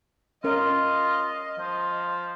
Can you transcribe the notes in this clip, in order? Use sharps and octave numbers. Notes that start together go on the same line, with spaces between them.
C#4 F4 A#4 D#5
F3